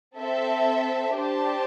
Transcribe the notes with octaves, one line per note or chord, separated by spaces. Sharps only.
C4 A4 E5
D4 G4 C5 A5